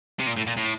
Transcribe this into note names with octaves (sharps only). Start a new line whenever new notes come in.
C3
A#2
A2
A#2
A2